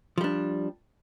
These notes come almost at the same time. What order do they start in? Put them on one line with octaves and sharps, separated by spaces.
F3 G3 D4